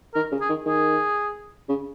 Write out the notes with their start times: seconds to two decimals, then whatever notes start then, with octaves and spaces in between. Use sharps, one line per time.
0.15 D#3 A#4
0.32 C#3
0.41 G#4
0.49 D#3
0.66 D#3 G#4
1.69 C#3